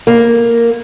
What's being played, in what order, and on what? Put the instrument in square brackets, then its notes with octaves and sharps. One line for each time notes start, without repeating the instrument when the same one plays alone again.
[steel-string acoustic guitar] A#3